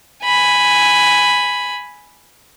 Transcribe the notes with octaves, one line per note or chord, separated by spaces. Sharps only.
G#5 B5